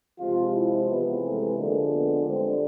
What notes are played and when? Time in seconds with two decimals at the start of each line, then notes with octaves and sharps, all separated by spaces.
0.18 C3 F3 G#3 F4
0.53 E4
0.88 C3 E3 G#3 B3
1.23 A3
1.57 D3 F3 G#3 A#3
1.92 B3
2.26 D3 G3 C4